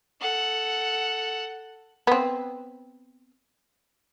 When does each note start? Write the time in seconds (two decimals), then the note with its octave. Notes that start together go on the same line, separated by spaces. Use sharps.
0.21 A4 F#5
2.07 B3 C4